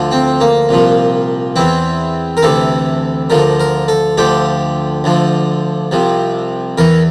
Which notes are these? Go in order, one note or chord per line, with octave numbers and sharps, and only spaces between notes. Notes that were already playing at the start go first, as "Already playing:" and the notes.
Already playing: D2 D3 F3
C4
A#3
C2 A#2 F3
E2 E3 C4
A#4
D2 C3 E3 A4
D2 D3 F3 A#4
A#4
A4
D2 D3 F3 G4
D2 D3 F3
C2 C3 F3
E2 E3 A#4